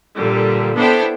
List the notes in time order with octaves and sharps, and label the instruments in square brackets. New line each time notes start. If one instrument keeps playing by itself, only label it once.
[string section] A#2 D3 G3
B3 D4 E4 A4 C5 G5